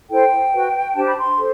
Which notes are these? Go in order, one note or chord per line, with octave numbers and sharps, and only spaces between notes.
E4 A4 C5 G5
F#4 B4
D4 G4 C5 A5
B5
C6
A4 C5